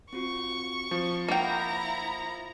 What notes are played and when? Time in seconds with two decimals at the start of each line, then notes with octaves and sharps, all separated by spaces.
0.13 C4 F4 F#4 C#6
0.91 F3 C4
1.28 A#3 E4 F#5 G5 A#5